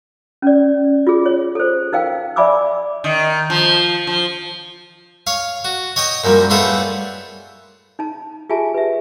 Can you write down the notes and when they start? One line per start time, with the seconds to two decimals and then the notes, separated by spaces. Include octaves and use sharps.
0.42 C#4 D5
1.07 F4 G#4
1.26 C#5
1.55 A4 C5
1.93 D#4 A#4 F5 G5
2.36 D5 E5 G#5 B5 D6 E6
3.04 D#3
3.50 F3
4.07 F3
5.27 C#5 F5
5.65 F#4
5.96 C#5 D#5 G5 C#6 D#6
6.24 F#2 A#2 F3 G3
6.50 A2 G3 B3 F4 G#4 A4
7.99 D#4 A5
8.50 F4 G4 G#4 E5 G#5 A5
8.74 B4 E5